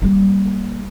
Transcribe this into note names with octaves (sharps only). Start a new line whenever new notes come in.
G3 A#3